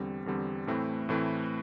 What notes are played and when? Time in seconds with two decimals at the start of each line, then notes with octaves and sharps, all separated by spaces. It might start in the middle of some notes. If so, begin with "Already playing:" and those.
Already playing: E2 D3 G3 C4
0.26 E2 D3 G3 C4
0.67 A2 E3 A3 C4 E4
1.09 A2 E3 A3 C4 E4